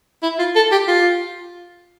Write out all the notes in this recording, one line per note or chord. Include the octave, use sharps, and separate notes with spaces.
E4
F4
A4
G4
F4